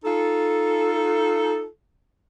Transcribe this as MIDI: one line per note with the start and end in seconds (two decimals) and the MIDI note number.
0.05 1.65 63
0.05 1.65 65
0.05 1.65 69